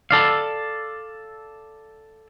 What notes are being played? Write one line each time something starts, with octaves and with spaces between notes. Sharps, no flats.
A4 D5 F5